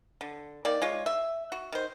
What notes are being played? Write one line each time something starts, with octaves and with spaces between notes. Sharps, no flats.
D3
D#3 A#3 D5
G#3 F4 C#5
E5
F#4
D#3 C5